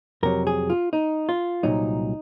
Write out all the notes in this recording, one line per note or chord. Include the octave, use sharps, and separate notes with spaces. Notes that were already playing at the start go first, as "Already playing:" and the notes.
F2 C3 F#3 A#4
G#4
F4
D#4
F4
C2 A#2 F#3 D#4